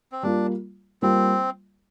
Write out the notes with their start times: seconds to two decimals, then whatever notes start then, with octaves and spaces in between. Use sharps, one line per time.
0.12 C4
0.23 G3 A#3 D4 F4
1.02 G3 A#3 C4 F4